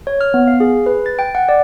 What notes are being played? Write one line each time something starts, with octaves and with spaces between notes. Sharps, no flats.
C#5
F6
B3
F5
G#4
B4
A6
G5
F#5
D5